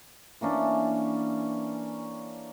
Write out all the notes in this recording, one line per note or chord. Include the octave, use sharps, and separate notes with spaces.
E3 A#3 C#4 D4